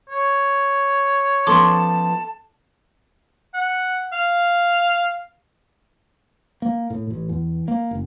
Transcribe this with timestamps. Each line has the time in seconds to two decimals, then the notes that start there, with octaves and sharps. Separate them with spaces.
0.10 C#5
1.47 F3 B3 C#4 A4 A5 C6 D6
3.54 F#5
4.13 F5
6.62 A#3
6.90 A2
7.10 A1
7.29 E2
7.68 A#3
7.91 F#1